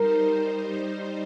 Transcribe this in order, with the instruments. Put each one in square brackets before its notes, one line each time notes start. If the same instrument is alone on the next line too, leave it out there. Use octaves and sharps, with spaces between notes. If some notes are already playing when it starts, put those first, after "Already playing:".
Already playing: [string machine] G3 D#4 C5 [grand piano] A#4